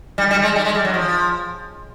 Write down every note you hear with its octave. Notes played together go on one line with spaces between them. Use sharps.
G3
G3
G#3
G3
G#3
G3
F#3
F3